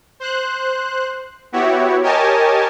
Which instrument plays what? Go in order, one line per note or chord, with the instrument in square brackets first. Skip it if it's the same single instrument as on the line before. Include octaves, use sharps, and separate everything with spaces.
[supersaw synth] C5 F#6
B3 E4 F#4 G4 C#5
G4 A#4 C#5 D#5 G#5 A5